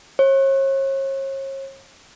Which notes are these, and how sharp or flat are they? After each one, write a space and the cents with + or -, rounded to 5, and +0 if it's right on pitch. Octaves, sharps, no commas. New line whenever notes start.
C#5 -40